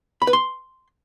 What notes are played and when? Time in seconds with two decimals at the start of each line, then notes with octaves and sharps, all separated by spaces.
0.22 B5
0.27 B4
0.33 C6